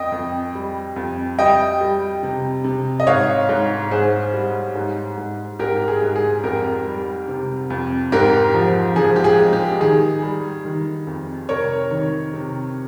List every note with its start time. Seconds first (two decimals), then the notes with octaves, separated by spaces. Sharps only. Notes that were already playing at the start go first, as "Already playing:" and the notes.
Already playing: F2 D#5 G5
0.12 F2
0.55 G3
0.96 F2
1.39 G3 D#5 G5
1.81 G3
2.23 C3
2.64 C3
3.00 D#5
3.07 G#2 C#5 F5
3.49 G#2
3.91 G#2 G#4 C5
4.33 G3
4.75 G#2
5.17 G#2
5.59 G#2 G4 A#4
5.88 G#4
6.02 G#2
6.16 G#4
6.44 F2 G4 A#4
6.86 G3
7.28 C3
7.70 F2
8.12 G#2 G4 A#4
8.54 F3
8.96 F3 G#4
9.16 G4
9.24 G#4
9.38 G#3
9.53 G4
9.80 D#3 G#4
10.22 G3
10.65 D#3
11.07 F2
11.49 C3 A#4 C#5
11.91 D#3
12.34 C3